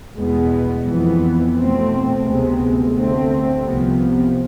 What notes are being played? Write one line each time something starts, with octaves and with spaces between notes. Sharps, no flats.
E2 B2 G#3 B3
F2 E3 B3
B2 A3 C4
D2 C3 G#3 B3
D2 D3 A3 C4
C2 C3 F3 B3